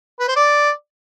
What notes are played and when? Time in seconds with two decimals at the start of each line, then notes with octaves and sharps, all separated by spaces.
0.19 B4
0.28 C5
0.36 D5